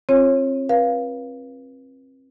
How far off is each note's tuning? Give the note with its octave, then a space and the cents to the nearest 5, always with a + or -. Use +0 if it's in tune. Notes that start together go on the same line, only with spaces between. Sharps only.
C4 +35 F4 +0 C#5 -30
B4 -35 F5 +0